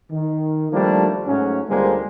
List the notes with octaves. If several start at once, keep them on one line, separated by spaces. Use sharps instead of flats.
D#3
D#3 F3 G3 A3 A#3 D4
G#2 F#3 A3 C#4
C#2 D3 G3 G#3 A#3 C5